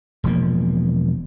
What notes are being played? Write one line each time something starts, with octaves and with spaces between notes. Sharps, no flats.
E1 F3 A#3